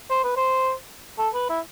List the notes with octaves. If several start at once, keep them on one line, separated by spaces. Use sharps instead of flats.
C5
B4
C5
A4
B4
E4